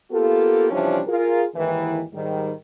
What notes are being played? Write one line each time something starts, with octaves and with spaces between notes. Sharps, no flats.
A#3 B3 F4 G4 A4
C3 E3 F3 G3 C#4 D4
F4 G#4 A#4
D#2 G#2 D#3 E3
G#2 D#3 G3